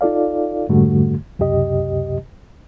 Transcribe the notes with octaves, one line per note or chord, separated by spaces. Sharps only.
D#4 F4 A4 D5 F5
F2 G#2 D3 G3 A3 F#4
C#2 F#2 C3 G4 D#5